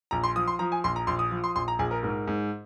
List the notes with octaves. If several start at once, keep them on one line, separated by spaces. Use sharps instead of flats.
A#1 A#5
C6
F3 D#6
C6
F3 A#5
G#5
A#1 C6
A#5
A#1 C6
D#6
F3
C6
A#1 C6
A#5
A#1 G#4
A#4
G#2 A#4
G#2